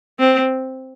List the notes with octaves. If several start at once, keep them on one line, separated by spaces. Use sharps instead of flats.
C4